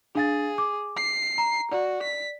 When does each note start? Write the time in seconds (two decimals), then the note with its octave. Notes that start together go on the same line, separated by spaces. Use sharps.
0.15 D4 G#4 F5 A6
0.58 D6
0.97 C7
1.38 A#5
1.72 F#4 D5
2.03 B6